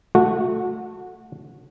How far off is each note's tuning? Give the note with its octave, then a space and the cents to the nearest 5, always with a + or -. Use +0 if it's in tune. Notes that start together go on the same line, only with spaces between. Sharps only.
A3 +0 F#4 -20